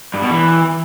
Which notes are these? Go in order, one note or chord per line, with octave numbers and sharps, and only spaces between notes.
G2
B2
E3